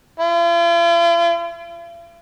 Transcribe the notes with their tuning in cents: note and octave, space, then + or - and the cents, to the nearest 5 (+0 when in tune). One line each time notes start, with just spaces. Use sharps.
F4 -45